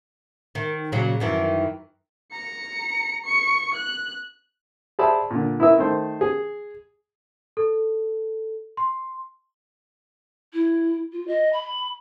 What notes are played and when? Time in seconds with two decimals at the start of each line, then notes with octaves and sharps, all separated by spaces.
0.55 D#3
0.92 A#2 C#3 F#3
1.20 F#2 D#3 E3
2.32 A#5 C#7
3.24 C#6 C#7
3.75 F#6
4.99 G#4 C5 D5 E5 A5 B5
5.31 A#2 D3
5.60 E4 A#4 B4 E5
5.78 D#3 A3 C5
6.21 G#4
7.57 A4
8.77 C6
10.53 E4
11.12 F4
11.27 D#5
11.53 B5